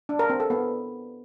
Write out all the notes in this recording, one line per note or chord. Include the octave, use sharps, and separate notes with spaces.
D4
A#4
C4
A4
B3